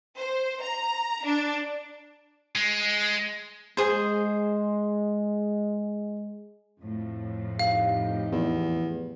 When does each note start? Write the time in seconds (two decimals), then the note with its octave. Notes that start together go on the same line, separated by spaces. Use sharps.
0.16 C5
0.61 A#5
1.24 D4
2.55 G#3
3.77 G#3 G#4 C5
6.81 F2 A2
7.59 D#4 G4 F5
8.32 E2